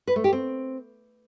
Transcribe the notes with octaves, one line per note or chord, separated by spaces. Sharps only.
B4
A3
G4
C4